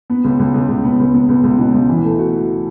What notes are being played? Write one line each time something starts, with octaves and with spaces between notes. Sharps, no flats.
B3
C#2
C#2
C#2
C#2
B3
C#2
B3
C#2
C#2
B2
C#2
E3
A3
F#4